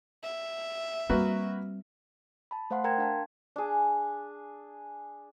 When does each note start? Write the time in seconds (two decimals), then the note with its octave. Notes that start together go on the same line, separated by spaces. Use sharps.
0.24 E5
1.10 G3 A#3 C4 F#4 B4
2.51 A5 B5
2.70 A3 C5 F5 F#5 C6
2.84 A#4 G5 A#5 C6 G#6
2.98 D4 F5 A5
3.56 D4 G#4